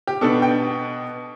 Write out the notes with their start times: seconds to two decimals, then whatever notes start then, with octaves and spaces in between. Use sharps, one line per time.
0.07 G4
0.21 B2 B3 D4 A4
0.42 G5